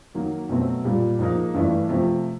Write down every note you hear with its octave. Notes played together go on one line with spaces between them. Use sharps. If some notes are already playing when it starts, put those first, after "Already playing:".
D#3 F#3 A#3
B2 F#3 A3 C4
A#2 G3 A#3
G#2 F3 A#3 D#4
G2 E3 A3 D4
C3 F3 A3